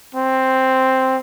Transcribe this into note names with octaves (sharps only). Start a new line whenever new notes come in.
C4